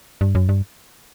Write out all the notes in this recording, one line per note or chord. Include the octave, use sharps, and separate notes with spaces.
G2
F#2
G2